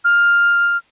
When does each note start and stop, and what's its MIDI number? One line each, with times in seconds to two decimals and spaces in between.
0.05 0.77 89